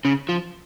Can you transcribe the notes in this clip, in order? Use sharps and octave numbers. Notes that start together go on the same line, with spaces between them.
C#3
F3